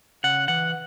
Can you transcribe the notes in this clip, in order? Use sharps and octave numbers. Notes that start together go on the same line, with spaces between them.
C#3 F#5
E3 F#5